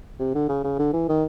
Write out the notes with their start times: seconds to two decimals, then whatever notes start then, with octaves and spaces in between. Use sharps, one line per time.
0.19 C3
0.35 D3
0.49 C#3
0.64 C#3
0.79 D3
0.93 E3
1.09 D#3